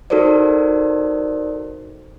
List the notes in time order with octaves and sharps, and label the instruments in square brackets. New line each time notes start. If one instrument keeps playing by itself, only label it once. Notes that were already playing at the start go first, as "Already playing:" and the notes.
[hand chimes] D#4 F#4 A4 A#4 C5 D5